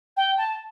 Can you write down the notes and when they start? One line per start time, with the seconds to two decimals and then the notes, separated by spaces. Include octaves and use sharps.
0.16 G5
0.37 A5